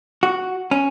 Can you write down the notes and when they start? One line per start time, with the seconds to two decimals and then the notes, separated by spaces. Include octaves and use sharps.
0.23 F#4
0.71 C#4